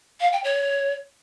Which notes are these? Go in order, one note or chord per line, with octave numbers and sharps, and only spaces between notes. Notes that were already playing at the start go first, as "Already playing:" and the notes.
F5
G5
C#5